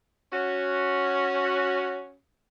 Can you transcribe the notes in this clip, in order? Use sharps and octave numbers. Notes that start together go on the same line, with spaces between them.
C#4 F#4